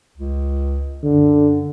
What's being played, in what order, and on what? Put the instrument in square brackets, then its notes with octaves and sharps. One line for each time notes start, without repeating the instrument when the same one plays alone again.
[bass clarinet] C#2
[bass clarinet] F#2 [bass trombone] D3